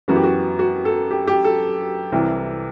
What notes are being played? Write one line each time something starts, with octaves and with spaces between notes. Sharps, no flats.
F#2 E3 B3 F#4
G4
F#4
F#4
A4
G4
G4
A4
C2 C3 E3